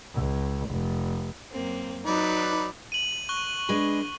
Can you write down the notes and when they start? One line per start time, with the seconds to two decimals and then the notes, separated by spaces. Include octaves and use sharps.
0.14 C#2
0.70 F1
1.51 F#2 A#3 C4
2.06 F#3 D#4 B4 D5
2.92 D#7 F#7
3.29 C#6 F#6 G7
3.69 G#3 D4 B4